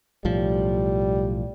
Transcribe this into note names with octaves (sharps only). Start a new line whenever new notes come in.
B1 A2 F3 G3